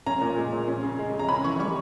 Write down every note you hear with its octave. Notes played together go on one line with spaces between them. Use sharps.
C#4 A#5
A#2
G#3
A#2
C#4
C#3
G#3
C#3
A#5
C#4 B5
E3 C#6
G3 C#6